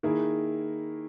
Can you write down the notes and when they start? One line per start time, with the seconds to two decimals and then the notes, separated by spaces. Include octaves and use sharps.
0.03 D#3 A#3 E4 G#4